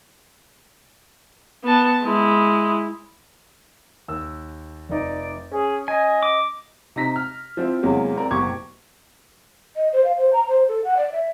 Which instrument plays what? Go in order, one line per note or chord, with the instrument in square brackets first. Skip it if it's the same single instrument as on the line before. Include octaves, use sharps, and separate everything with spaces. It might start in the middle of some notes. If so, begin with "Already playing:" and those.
[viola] B3 A5
G#3 E4
[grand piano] D#2 E6
[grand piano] F1 D#4 [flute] D5
[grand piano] C#4 [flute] G#4
[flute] D#5 [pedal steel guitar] G#5
[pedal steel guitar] D6
[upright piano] C3 D#4 A#5 A#6 B6
F6
F3 C4 E4
E2 C3 F#3 G#3 A#3
C4 A#4 D5
F#1 B2 G4 C#6 D6 G#6
[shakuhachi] D#5
C5
F5
C5
A#5
C5
A4
F#5
D5
E5